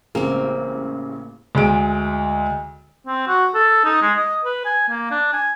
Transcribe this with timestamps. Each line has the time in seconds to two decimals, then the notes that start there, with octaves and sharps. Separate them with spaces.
0.15 A1 C#3 G#3 A#3 C4
1.55 D2 G#3 D7
3.07 C4
3.27 F#4
3.55 A4
3.85 D#4
4.02 G#3
4.17 D#5
4.45 B4
4.65 G#5
4.89 A#3
5.11 D4
5.33 G#5